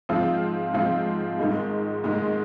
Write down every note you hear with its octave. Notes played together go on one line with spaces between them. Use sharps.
G#2 F3 C4 F4
G#2 F3 C4 F4
G#2 D#3 G#3
G#2 D#3 G#3